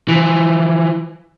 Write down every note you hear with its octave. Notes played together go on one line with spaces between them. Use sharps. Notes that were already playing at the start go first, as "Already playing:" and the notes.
E3 F3